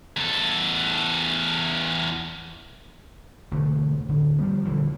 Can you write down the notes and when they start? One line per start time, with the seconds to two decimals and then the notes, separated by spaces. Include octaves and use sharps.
0.17 E2 A4
3.52 E1 D3 A3
4.08 D1 D3
4.39 F3 G3 B3
4.65 D#1 D3 E3 F3